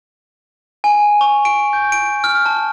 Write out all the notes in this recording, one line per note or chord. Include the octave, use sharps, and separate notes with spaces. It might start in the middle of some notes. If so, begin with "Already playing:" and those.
G#5
C#6
D7
G6
D7
F6
A5